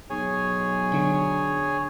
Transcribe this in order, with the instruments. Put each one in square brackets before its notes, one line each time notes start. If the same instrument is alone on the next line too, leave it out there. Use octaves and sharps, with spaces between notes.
[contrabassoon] B1 [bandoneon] G#4 C#5 G#5
[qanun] D3 F#3 C#6